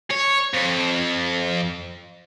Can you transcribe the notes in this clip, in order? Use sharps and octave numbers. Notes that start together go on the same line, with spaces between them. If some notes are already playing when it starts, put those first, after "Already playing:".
C#5
F2